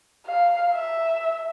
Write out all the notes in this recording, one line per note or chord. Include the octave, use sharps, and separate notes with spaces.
F5
E5